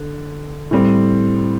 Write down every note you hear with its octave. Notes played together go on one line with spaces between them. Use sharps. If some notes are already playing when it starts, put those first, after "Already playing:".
Already playing: D3
A2 G3 C4